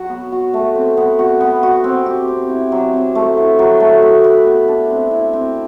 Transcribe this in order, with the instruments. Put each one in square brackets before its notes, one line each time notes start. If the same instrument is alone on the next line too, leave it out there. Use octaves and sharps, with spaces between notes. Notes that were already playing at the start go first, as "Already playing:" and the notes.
Already playing: [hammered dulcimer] F#3 F#4
B3
F#4
A3
C4
B3
F#4
B3
F#4
C4
G4
C4
E4
F#3
C4
A3
E4
F#3
A3
E4
B4
B3
D4
C4
E4
C4